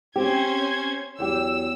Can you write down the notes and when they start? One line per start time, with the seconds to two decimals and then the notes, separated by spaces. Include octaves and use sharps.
0.16 C4 C#4 G4 C5 G#6
1.19 E2 F#3 G4 E6